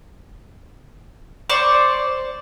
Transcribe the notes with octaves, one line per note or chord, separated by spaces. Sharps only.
C5 D5 C#6